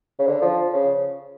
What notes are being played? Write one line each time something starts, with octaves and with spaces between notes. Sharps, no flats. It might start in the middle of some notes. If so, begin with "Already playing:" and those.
C#3
D3
F3
C#3